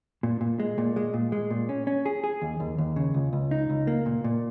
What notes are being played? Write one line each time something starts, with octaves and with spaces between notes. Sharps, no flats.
A#2
A#2
G#3
A#2
G#3
A#2
G#3
A#2
C#4
C#4
G#4
G#4
D#2
D#2
D#2
C#3
C#2
C#2
D#4
C#2
A#3
A#2
A#2